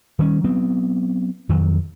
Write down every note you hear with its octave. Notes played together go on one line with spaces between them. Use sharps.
D#3 G3 C#4
F#3 B3 C4
F2 D#3 F#3